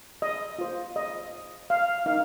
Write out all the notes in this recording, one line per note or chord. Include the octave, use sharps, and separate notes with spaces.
D#5
F4 C5
D#5
F5
D#4 A#4 F5